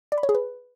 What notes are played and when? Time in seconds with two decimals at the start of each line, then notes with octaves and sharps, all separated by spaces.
0.12 D5
0.18 B5
0.23 C#5
0.29 G#4
0.35 B4